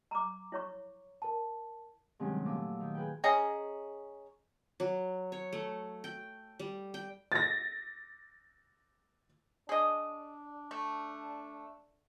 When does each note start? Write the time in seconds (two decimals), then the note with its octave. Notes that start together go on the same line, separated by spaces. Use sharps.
0.11 A#5 D6
0.52 E4 C#5 C#6
1.22 A#4 A5
2.19 G2 C3 D#3 F#3 G#3 C#4
2.45 A#2 A3 D6 E6
2.80 D#3
2.94 G#4 B4 G5
3.24 C#4 G#4 D#5 A#5
4.80 F#3
5.32 C#5
5.53 A3
6.04 G5
6.59 G3
6.94 G5
7.32 A6 A#6
9.69 D4 G#4 D#5
10.71 A3